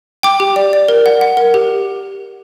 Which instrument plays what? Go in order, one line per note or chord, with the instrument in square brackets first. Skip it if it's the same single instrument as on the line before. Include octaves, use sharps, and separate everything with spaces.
[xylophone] G5 D6
G4
D5
D5
A#4
F#5
F#5
A#4
G4